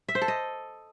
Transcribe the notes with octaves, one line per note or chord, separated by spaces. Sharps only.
E5
C5
A4
D#5